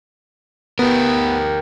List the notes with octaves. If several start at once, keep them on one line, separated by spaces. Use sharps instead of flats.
B3 G4 A#4